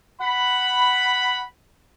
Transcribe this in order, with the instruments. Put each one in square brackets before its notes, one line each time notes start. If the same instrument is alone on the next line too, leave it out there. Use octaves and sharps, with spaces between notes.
[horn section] F#5 B5